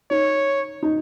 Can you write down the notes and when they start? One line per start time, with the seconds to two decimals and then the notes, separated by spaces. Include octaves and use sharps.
0.11 D#4 C#5
0.83 D#4